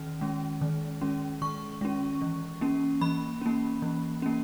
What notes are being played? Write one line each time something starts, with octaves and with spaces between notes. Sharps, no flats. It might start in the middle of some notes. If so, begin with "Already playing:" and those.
Already playing: D#3 C#4
G#3 C#4
D#3
G#3 C#4
D#3 C#6
G#3 C#4
E3
A#3 C#4
E3 B5
A#3 C#4
E3
A#3 C#4